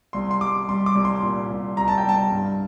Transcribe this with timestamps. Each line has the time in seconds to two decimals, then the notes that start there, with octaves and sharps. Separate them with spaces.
0.13 C2 C6
0.31 C6
0.41 G3 D6
0.69 G3 C6
0.86 D6
0.95 C2
1.05 C6
1.23 A#2
1.50 C2
1.77 C2 A#5
1.88 A5
1.98 G5
2.04 C2 A5
2.32 G2